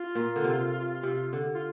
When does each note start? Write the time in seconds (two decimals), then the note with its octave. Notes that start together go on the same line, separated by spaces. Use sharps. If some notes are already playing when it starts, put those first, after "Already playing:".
Already playing: F4
0.15 A#2
0.36 D3
0.44 C3
1.03 C3
1.33 D3
1.55 F4